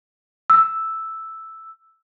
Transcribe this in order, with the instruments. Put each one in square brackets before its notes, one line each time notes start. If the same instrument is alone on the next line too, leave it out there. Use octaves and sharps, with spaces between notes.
[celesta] E6